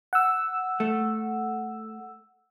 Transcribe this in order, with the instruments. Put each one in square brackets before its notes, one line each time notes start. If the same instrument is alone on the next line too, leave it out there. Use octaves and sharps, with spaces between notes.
[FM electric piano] F#5 E6
[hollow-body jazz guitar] A3